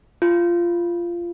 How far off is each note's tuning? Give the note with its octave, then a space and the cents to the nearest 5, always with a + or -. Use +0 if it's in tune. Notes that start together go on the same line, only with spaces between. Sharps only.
F4 -15